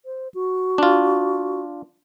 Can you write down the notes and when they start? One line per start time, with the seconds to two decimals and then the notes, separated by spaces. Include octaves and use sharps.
0.05 C5
0.34 F#4
0.78 D4 F4